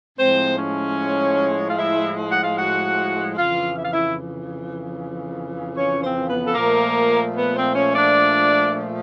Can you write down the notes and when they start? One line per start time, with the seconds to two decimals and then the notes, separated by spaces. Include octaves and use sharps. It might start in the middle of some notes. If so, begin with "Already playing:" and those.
0.18 A2 F3 G#3 C4 C5
0.58 C#4 C#5
1.70 F5
1.77 E4 E5
2.30 F#5
2.43 F5
2.56 F#4 F#5
3.37 F2 C#3 E3 F4 F5
3.76 E5
3.83 F5
3.91 E4 E5
5.76 C#4 C#5
6.02 C4 C5
6.28 B3 B4
6.45 A4
6.55 A#2 F3 A3 A#3 A#4
7.35 B3 B4
7.55 C4 C5
7.75 C#4 C#5
7.94 D4 D5